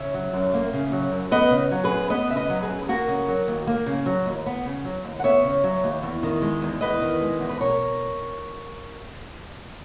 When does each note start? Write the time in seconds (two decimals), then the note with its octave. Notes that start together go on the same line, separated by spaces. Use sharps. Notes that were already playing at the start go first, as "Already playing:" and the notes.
Already playing: C#3 C#5 E5
0.14 F#3
0.33 F#2
0.54 A#3
0.73 C#3
0.92 F#3
1.11 F#2
1.32 B3 B4 D#5
1.51 C#3
1.72 F#3
1.84 G#4 B4
1.91 F#2
2.10 B3 B4 D#5
2.30 C#3 E5
2.36 B4 D#5
2.50 F#3
2.62 G#4 B4
2.69 F#2
2.83 G#4
2.89 A#3 F#4 A#4
3.08 C#3
3.28 F#3
3.48 D#2
3.67 A#3
3.86 C#3
4.06 F#3
4.26 D#2
4.46 B3
4.66 C#3
4.85 F#3
5.05 D#2
5.19 F#5
5.24 B3 C#5 E5
5.44 C#3
5.64 F#3
5.84 D#2
6.03 E2
6.23 D#3
6.42 G#3
6.62 E2
6.81 E2 B4 D#5
7.02 D#3
7.21 G#3
7.40 E2
7.49 B4
7.60 B2 A#4 C#5